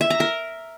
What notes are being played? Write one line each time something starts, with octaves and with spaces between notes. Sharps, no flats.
E5
A#5
A#4